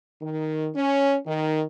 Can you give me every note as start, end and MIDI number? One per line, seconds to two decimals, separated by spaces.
0.21 0.69 51
0.75 1.17 61
1.26 1.63 51